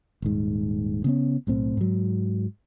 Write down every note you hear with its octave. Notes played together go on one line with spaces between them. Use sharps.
D#1 G#2
C#3 B3 C#4
B1 A2 C4
G#2 F#3